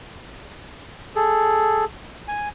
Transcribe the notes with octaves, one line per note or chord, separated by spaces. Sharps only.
G#4 A4
G#5